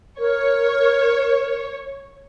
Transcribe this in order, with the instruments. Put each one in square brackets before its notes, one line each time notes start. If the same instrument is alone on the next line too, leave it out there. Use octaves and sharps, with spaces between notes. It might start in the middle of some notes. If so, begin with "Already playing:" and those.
[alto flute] A#4 [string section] C#5